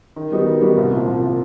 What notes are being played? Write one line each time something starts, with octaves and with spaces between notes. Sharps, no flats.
D#3
G3 B3 D#4 F#4
D#3
G3 B3 D#4 F#4
C2
A#2 F3
C2
A#2 F3